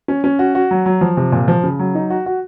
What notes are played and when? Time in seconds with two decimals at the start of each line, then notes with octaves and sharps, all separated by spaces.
0.08 C#4
0.24 C#4
0.39 F#4
0.55 F#4
0.71 F#3
0.86 F#3
1.01 F3
1.17 C3
1.32 A#2
1.48 F3
1.63 C#3
1.79 F#3
1.95 D#4
2.10 F#4
2.26 F#4